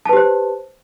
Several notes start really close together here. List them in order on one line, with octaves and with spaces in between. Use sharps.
A5 B4 G4 C5